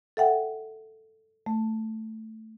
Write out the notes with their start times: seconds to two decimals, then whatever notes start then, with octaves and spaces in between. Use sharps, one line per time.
0.17 A4 E5 F#5 G5
1.46 A3